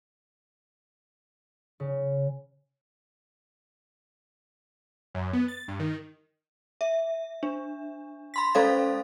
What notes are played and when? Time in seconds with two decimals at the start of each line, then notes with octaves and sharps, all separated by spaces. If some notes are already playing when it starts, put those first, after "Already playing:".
1.80 C#3
5.15 F#2
5.33 B3
5.48 A6
5.68 G2
5.80 D#3
6.81 E5
7.43 D4
8.34 B5 C6 B6
8.55 G#3 C#4 A4 C5 F5 A6